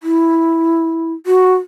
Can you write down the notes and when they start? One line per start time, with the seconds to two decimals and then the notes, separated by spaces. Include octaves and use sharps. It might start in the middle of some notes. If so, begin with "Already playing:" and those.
0.03 E4
1.26 F#4